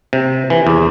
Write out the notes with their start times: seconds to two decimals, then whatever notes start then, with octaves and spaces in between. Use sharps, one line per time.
0.13 C3
0.50 E3
0.67 E2